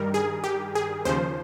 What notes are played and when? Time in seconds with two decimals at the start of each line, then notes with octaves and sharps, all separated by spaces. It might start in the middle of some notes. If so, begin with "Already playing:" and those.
Already playing: G2 D#3 G3 A#4
0.14 G#4
0.44 G4
0.75 G#4
1.05 D#2 C#3 F3 C5